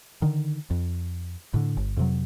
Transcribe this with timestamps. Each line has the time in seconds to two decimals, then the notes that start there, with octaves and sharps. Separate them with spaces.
0.22 D3 D#3
0.70 F2
1.54 A2 D3
1.77 G1
1.97 F2 C3 F#3